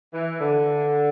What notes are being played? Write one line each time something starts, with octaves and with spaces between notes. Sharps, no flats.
E3
D3